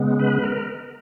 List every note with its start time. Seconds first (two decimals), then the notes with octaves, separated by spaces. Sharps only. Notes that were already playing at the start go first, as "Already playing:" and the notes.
Already playing: C#3 G#3 B3
0.19 B4
0.43 A#4